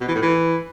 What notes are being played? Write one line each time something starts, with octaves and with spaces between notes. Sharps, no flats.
B2
E3
A2
E3